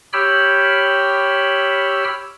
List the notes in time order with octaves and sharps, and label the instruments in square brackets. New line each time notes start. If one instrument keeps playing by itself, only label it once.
[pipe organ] G4 C#5 G5 B5 E6 F6